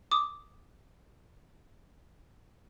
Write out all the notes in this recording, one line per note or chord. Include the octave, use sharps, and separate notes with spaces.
D6 D#6